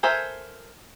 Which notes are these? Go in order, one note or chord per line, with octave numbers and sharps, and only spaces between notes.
A4 A#4 C5 E5 G#5